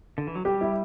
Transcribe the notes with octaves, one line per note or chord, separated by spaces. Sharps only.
D3
E3
F#3
G3 G4
E4